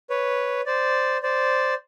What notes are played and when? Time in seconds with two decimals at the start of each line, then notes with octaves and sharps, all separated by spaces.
0.10 B4 C#5
0.66 C5 D5
1.23 C5 D5